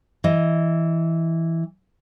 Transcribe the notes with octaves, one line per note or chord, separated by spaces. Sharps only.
E3 D#5